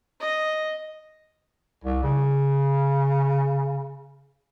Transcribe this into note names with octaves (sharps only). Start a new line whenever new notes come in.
D#5
C2
C#3